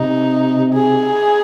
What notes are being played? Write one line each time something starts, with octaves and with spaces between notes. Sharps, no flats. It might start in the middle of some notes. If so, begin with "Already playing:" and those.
Already playing: C3 D#4
G#4